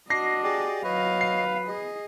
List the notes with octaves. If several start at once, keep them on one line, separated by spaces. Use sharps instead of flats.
D4 F#4 D#5 A#6 C7
G4 G#4 D5
F#3 B4 C#5 D#5 F5
C7
G#4 D#5